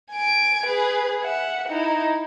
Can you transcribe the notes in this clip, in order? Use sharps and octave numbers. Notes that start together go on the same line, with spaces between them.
G#5 D7
G#4 B4
E5 F#5
D#4 E4